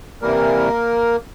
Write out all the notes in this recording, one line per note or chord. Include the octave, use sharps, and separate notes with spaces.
C3 E3 G3 A#3 A#4